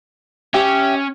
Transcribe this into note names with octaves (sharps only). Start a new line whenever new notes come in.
C#4 G4 E5